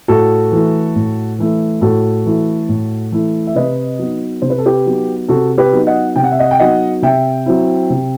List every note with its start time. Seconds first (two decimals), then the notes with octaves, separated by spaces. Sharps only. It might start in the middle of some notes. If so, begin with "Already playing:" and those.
0.08 A2 F#4 A4
0.52 E3 A3 E4
0.95 A2
1.39 E3 A3 E4
1.81 A2 F#4 A4
2.25 E3 A3 E4
2.69 A2
3.12 E3 A3 E4
3.47 E5
3.55 C3 B4 D#5
3.99 F#3 B3 D#4
4.42 C3 C5
4.50 B4
4.58 A4
4.66 G4 B4
4.86 F#3 B3 D#4
5.29 C3 F#4 A4
5.58 G4 B4
5.72 F#3 B3 D#4
5.87 D#5 F#5
6.16 C3 G5
6.24 F#5
6.32 E5
6.39 D#5 F#5
6.51 G5
6.59 F#3 B3 D#4 D#5 F#5
7.02 C3 E5 G5
7.46 F#3 C4 E4
7.90 C3